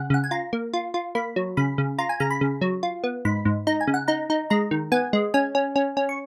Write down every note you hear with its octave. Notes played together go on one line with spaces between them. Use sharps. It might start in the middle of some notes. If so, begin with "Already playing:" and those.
Already playing: C#3 F#5
C#3 F#5
G#5
F4 A#5
A#3
F4
F4
A#3 B5
F#3
C#3 B5
C#3
F4 A#5
G#5
C#3 A#5
B5
C#3
F#3
F4
B3
G#2 B5
G#2
D#4 A#5
G#5
C#3
F#5
D#4 A#5
D#4
G#3 A#5
D#3
B3 G#5
G#3
C#4 G#5
C#4
C#4
C#4
C#6